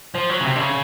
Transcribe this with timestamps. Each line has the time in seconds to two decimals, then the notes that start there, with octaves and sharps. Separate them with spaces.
0.15 F3
0.30 F#3
0.40 C#3
0.45 C3
0.56 D3
0.60 C#3